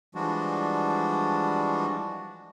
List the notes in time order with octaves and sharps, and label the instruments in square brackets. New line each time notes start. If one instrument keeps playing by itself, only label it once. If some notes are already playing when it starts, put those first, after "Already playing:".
[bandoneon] E3 F3 G3 G#3 D4 F#4